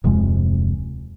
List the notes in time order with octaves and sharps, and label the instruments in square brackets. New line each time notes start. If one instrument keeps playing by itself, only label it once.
[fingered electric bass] D1 F2 C3 G#3